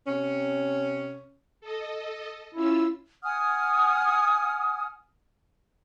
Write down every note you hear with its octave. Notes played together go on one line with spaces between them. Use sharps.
C3 C#4
A4 D#5
C#4 E4 F4 E6
F#5 G#5 D#6 F6